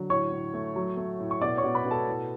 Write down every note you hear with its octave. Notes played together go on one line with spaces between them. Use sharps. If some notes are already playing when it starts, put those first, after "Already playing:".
Already playing: D3 F#3
A2 C#5 C#6
A2
A3
F#3
A3
A2
C#6
B2 D5 D6
C#5 C#6
B2
B4 B5
B2
A4 A5
A2